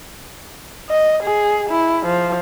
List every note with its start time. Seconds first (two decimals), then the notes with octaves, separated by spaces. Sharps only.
0.90 D#5
1.23 G#4
1.70 E4
2.06 F3